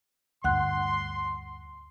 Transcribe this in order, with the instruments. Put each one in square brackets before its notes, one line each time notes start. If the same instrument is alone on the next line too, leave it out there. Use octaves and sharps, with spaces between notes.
[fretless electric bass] D2 G2 [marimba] F#5 F#6 [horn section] C6